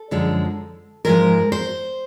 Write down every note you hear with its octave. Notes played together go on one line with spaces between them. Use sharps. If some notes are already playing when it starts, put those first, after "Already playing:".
Already playing: A4
F#2 D3 F3 G#3
G#2 F3 G#3 A#4
C5